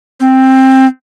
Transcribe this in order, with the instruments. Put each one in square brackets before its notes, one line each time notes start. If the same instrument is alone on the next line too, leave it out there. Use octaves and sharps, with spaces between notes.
[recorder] C4